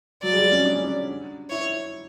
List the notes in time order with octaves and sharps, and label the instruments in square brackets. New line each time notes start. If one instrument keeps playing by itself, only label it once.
[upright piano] F#3 [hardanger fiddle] D5
[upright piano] G#3
G3
C#4
D4
C#4
D4
[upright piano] E4 [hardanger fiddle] C#5